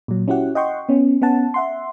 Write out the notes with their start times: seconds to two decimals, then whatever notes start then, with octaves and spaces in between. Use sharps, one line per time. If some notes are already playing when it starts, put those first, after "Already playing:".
0.08 A#2 F#3
0.28 C#4 E4 F#4 G4 F#5
0.55 D#5 F#5 G5 C6 C#6
0.89 B3 C#4
1.22 B3 C#4 F#5 A5
1.54 E5 F#5 C6